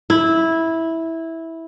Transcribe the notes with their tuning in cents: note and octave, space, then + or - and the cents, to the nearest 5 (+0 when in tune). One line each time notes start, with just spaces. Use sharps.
E4 -10